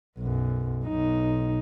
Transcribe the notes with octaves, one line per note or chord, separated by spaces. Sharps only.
B1 F#2
B1 D#4